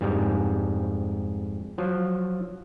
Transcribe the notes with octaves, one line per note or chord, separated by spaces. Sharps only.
F2 G#2 G3
F3 F#3